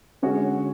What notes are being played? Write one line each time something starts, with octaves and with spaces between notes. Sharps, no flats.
D3 G#3 C#4 F#4 C#5